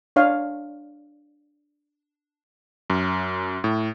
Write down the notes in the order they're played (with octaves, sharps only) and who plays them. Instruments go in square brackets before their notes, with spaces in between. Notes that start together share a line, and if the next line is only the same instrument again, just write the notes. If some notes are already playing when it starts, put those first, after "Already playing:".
[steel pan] D4 C#5 F5
[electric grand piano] F#2
A2